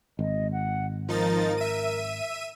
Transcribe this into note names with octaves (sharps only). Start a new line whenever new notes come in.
G#1 D#5
F#5
F3 D#4 A#4 A6
E5 D#7